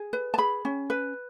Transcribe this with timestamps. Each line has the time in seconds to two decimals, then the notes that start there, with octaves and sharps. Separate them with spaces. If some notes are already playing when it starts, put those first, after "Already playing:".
Already playing: G#4
0.13 B4
0.34 A5
0.38 G#4 B5
0.65 C#4
0.90 B4